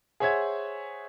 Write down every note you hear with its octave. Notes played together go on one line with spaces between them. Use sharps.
G#4 C5 C#5 E5 F#5 G#6